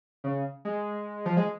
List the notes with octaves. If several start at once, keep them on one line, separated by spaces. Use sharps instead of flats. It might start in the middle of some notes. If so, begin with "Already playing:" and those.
C#3
G#3
F3
G#3